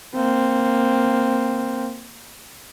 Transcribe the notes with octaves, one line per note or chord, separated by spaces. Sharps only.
A#3 C4